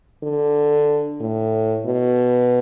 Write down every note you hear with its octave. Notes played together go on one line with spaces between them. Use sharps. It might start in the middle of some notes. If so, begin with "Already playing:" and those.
D3
A2
B2